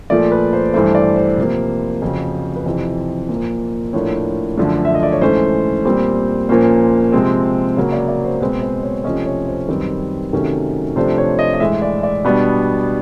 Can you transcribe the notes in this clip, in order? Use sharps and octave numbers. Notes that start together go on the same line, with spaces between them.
A#2 F3 A3 D5
B4
C5
G2 E3 A3 C5
D5
C5
C3 F3 A#3
F2 C#3 F#3
B4
F2 C3 E3 C5
A#2 F3 A#3
A2 F3 A#3 D4 C#5
F#2 D3 F3 A3 D4
E5
D#5
D5
C#5
G#2 E3 A3 C#4 C5
A#2 G3 C4
A#2 F3 A#3 C#4 C5
C3 F3 G#3 C4
C#3 F#3 A#3 C#5
D5
D5
C5
B2 G#3 C4 B4
C5
C#5
C3 F3 A3 C#4 D#5
C#5
C5
F#2 D#3 G3 C4 B4
C3 D#3 F#3 A3 C#4
C3 F3 A3 D4 C5
C#5
D#5
D#5
A2 E3 G#3 E5
D5
D5
B2 G3 B3 D4